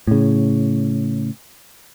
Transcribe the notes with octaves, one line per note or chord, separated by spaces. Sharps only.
A2 C#3